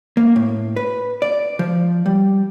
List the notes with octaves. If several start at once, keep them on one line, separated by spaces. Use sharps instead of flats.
A#3
A2
B4
D5
F3
G3